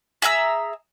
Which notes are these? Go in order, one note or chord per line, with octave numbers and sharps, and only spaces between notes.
G#4 E5 A#5 E6